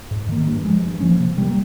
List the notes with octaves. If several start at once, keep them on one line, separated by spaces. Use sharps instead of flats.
G#2
D#3 A#3
G2
F3 G#3
G2
F3 A#3 C#4
C3
G3 A#3